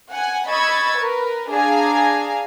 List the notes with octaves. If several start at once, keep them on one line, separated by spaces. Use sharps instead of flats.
F#5 G#5
D#5 B5 C#6 E6 G#6 A6
A#4 B4
D4 G#4 F5 G#5 A#5